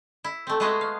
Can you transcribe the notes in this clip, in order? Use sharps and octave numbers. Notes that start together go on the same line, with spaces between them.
E4
A3 C4
G#3 A3 B3 F#4 G#4 D#5
F5